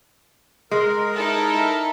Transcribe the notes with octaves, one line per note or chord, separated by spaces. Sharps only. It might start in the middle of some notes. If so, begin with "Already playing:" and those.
G#3 A#4
D#4 E4 A4